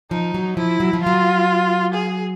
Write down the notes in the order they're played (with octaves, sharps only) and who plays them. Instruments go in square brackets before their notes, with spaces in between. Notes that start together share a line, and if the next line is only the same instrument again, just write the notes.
[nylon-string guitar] F3 [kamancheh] D#4
[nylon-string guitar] F#3
[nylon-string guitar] F3 [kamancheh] E4
[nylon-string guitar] F#3
F3
[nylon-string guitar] F#3 [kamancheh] F4
[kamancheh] G#4